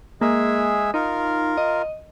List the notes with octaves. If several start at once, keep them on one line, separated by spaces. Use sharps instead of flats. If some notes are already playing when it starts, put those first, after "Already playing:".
G#3 A#3 G#4 E5
D#4 F4 A#4
D#5